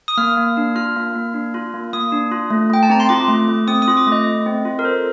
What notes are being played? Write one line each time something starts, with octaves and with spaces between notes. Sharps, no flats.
D#6
A#3 F6
A#3
D4
F4 F6
A#3
A#3
D4
F4
A#3
A#3 D#6
D4
F4
A3
A3 G5
A5
C4 A#5
C6
F4 D6
A3
A3
C4 D#6
D#6
F4
D6
A3
D#5
A3
C4
F4
A#4
A4 C5